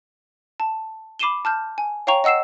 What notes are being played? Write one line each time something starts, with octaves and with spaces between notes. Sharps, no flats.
A5
B5 D6 C7 D#7 E7 G7
A5 F6 G6
G#5
C#5 F5 G5 A#5 C#6 F7
D#5 F#5 E6 C7 E7